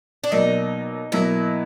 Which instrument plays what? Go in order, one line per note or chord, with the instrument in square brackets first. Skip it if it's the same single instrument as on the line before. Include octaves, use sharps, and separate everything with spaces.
[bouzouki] D4
[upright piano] B2 F#3 A#3 [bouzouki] D#4
[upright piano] B2 F#3 A#3 [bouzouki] E4